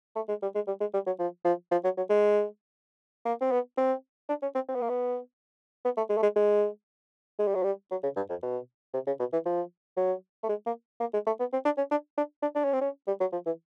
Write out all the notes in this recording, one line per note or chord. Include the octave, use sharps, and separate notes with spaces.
A3
G#3
G3
G#3
G3
G#3
G3
F#3
F3
F3
F3
F#3
F#3
G#3
A#3
C4
B3
C4
D4
C#4
C4
C4
B3
A#3
B3
B3
A3
G#3
A3
G#3
G#3
G#3
G3
F#3
G3
F#3
C#3
G2
F2
B2
C3
C#3
B2
E3
F3
F#3
A3
G#3
A#3
A#3
G#3
A3
B3
C4
D4
C#4
D4
D4
D4
D4
C#4
C4
C#4
G3
F#3
F3
E3